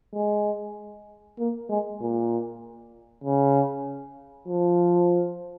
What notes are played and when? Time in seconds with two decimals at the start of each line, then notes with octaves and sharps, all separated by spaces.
0.15 G#3
1.39 A#3
1.69 G#3
2.01 A#2
3.24 C#3
4.48 F3